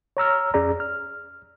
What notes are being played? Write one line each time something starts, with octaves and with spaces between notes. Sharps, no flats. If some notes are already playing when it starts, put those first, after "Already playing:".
C#5 A#5 E6 F6
F2 C#4 G#4 D5 A#5
F6